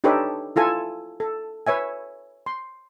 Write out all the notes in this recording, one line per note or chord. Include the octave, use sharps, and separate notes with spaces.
D4 D#4 G4 A4 B4 C#5
E4 F4 A4 G#5
A4
B4 C#5 E5 G#5
C6